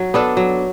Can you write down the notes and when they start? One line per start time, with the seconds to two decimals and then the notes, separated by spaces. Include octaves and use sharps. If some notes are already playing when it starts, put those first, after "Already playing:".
Already playing: F#3
0.14 B3 D4 A4
0.37 F#3